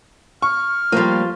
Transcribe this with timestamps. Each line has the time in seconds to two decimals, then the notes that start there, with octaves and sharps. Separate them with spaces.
0.42 C#6 F6
0.92 F3 G3 A#3 F4